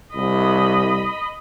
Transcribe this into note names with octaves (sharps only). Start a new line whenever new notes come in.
C2 D#5 B5